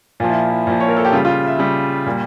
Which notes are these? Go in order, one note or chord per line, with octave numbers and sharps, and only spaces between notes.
A#2 F3 F4
E4
E4
A#2 F3
C#5
A#4
A4
G4
C#3 G3 F4
F4
E5
C#3 G3
A#2 G3